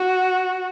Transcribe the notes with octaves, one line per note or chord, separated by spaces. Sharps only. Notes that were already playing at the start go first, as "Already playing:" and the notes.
Already playing: F#4